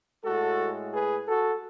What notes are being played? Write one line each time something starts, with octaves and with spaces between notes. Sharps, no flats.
A2 G#3 F#4 A4
G#4 B4
F#4 A4